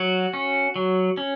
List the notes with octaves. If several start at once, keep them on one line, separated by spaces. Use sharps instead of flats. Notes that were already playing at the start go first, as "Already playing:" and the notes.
Already playing: F#3 F#4
C#4
F#3
C#4